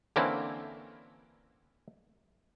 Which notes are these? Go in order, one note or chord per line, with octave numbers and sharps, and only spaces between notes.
D3 E3 A#3 C4 C#4 E4